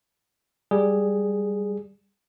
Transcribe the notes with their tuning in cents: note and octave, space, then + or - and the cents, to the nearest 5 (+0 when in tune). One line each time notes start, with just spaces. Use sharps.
G3 +5 G#4 +0